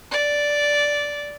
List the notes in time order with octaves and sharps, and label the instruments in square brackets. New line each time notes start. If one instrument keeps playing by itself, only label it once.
[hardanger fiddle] D5